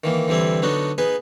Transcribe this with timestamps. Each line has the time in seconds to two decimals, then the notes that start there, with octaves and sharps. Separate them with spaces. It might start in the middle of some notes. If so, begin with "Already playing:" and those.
0.04 D#3 E3 A#3
0.28 D3 E3 G3 C4 E4
0.62 D3 F#3 B3 D4 D#4 F#4
0.98 B3 D#4 G#4 B4